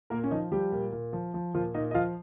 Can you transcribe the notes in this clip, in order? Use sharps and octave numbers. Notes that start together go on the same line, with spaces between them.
A#2 A#3 A#4
C#4
F3 D#4
F3 G3 G4
A#2
A#2
F3
F3
A#2 F3 F4
A#2 D#4 D#5
D#5
F3 F4 F5